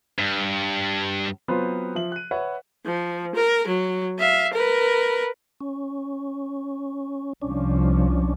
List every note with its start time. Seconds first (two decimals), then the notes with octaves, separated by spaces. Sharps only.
0.19 G2
1.48 F#3 B3 C4 F4 B4 C5
1.95 F3 E5 F#7
2.12 F#6 D#7
2.31 B4 C#5 E5 F#5
2.86 F3
3.35 A#4
3.67 F#3
4.19 E5 F5
4.53 A#4 B4
5.61 C#4
7.42 C2 F3 C#4 D4